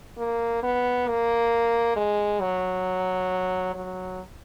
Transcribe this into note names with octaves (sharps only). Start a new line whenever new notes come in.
A#3
B3
A#3
G#3
F#3
F#3